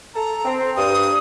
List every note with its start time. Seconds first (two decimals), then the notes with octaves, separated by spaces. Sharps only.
0.14 A4 A#5
0.45 C4
0.77 G2 D#6